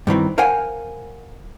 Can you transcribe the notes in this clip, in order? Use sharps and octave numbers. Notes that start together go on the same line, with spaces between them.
G2 D#3 E3 C4
A#4 C5 F5 F#5 G#5